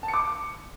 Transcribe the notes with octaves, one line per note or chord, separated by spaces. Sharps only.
A5
C#7
D6